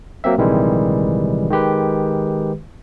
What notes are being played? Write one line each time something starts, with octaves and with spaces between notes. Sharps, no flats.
F#3 A#3 C4 E5
A#1 C3 D#3 E3 G3 G#3
D#3 G#3 G4 B4